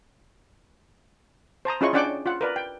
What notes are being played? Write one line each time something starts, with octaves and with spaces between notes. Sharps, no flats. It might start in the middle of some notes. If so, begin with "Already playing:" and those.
C5 A5 A#5 D#6
C#4 E4 F4 G#4 D#5 C#6
C#4 D4 D5 F#5 G5 D6
F4 F#5
A#4 B4 D5
G5